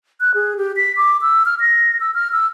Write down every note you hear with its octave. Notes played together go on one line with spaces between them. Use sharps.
F#6
G#4
G4
B6
D6
E6
F6
A#6
E6
F6
E6